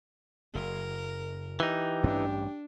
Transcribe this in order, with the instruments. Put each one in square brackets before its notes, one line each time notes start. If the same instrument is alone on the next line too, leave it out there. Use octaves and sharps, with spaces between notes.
[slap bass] F#1 [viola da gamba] A#4
[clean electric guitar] E3 D#4 [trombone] G4
[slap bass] A1 G2 C#4 [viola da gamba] D4